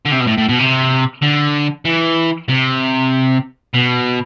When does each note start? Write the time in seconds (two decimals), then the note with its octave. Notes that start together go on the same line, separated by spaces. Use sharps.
0.06 D3
0.12 C3
0.20 B2
0.27 A2
0.38 A2
0.49 B2
0.59 C3
1.22 D3
1.85 E3
2.48 C3
3.74 B2